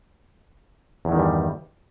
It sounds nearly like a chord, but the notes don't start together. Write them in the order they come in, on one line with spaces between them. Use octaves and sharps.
E2 E3 D#3 G2 G3